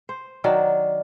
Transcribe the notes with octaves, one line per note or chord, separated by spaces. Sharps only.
C5
D#3 F#3 D4